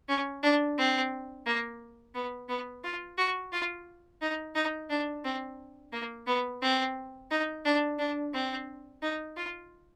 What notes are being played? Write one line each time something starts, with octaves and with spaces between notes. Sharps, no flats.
C#4
D4
C4
A#3
B3
B3
F4
F#4
F4
D#4
D#4
D4
C4
A#3
B3
C4
D#4
D4
D4
C4
D#4
F4